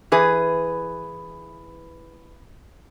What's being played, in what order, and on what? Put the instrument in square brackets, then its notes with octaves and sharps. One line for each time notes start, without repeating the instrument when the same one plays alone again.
[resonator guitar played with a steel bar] E3 G#4 B4